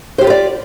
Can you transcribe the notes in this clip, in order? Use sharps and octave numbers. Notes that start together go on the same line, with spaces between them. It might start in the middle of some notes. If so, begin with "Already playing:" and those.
F4 G4 B4 C5 D5